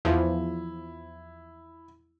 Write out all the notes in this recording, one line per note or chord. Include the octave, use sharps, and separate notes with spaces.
E2 F3 E4